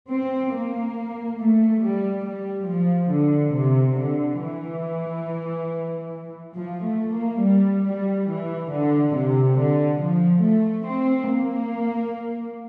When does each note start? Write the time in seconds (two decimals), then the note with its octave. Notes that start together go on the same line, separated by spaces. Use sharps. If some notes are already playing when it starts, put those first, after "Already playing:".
0.08 C4
0.52 A#3
1.38 A3
1.81 G3
2.24 G3
2.67 F3
3.10 D3
3.54 C3
3.97 D3
4.40 E3
6.56 F3
6.84 A3
7.13 A#3
7.41 G3
7.85 G3
8.28 E3
8.72 D3
9.14 C3
9.58 D3
10.00 F3
10.43 A3
10.86 C4
11.30 A#3